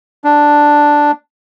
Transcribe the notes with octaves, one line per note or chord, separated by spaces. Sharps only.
D4